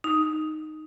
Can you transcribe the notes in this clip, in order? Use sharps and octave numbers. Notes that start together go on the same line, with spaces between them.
D#4